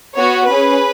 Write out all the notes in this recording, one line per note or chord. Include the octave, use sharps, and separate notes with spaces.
B3 F#4 C#5
C#4 B4
G#4